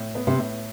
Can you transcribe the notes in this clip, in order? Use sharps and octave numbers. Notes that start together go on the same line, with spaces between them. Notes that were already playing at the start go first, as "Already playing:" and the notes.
Already playing: A2
B3
C3
A2